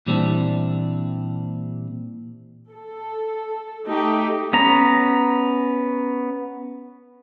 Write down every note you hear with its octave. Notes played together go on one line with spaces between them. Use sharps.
A#2 E3 G3 C4 D4
A4
A3 D#4 G4
B3 C#4 A#5